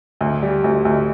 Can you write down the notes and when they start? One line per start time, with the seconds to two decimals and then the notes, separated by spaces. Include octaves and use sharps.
0.21 D2
0.42 G3
0.64 D2
0.85 D2